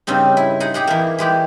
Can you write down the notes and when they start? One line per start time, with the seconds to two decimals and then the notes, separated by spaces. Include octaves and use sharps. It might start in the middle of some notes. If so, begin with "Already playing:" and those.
0.07 G2 C#3 C4 D#4
0.37 E4
0.60 D#4 G#4 F#5
0.74 G4 G#4 F#5
0.87 E3 A#3
1.19 E3 G#3 G4